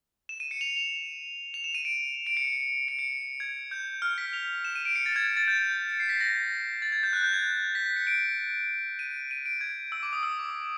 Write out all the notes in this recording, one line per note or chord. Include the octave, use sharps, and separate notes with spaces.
E7
D#7
C#7
F7
F7
F7
E7
D#7
D7
D7
C#7
C#7
D7
C#7
G#6
G6
F6
B6
F7
E7
D#7
D7
C#7
A6
G#6
G#6
A6
G6
G6
C#7
C7
B6
A#6
A6
G#6
G6
F#6
G6
G#6
B6
B6
C#7
D7
D#7
D#7
D7
G#6
E6
D6
D#6
E6
D6